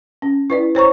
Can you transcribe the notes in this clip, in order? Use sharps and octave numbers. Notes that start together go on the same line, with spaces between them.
C#4
E4 B4 D5
C5 C#5 A#5 C#6